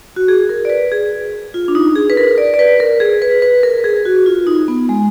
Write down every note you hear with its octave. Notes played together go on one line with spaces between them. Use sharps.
F#4
G#4
A#4
D5
B4
G#4
F4
D4
D#4
G#4
B4
A#4
D5
D5
B4
A#4
G#4
B4
B4
A#4
G#4
F#4
F4
D#4
B3
G#3